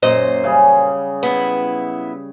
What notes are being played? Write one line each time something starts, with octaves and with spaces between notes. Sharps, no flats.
F#2 A#2 C5 D#5
C#3 G3 G#4
B3 E4